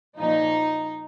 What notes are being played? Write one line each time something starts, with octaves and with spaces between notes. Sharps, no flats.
A#2 F3 D#4